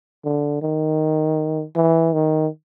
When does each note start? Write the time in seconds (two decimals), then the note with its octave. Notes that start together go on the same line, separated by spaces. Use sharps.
0.24 D3
0.62 D#3
1.76 E3
2.13 D#3